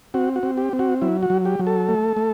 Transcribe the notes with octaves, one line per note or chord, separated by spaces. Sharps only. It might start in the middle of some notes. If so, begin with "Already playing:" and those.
C4 F#4
F#4
C4
G4
C4
F#4
F#3 E4
F#4
F#3
G4
F#3
A4
A3
A3